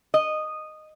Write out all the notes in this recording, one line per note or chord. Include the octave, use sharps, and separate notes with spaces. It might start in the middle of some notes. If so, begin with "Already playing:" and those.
D#5